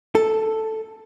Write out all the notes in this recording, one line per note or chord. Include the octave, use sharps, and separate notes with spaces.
A4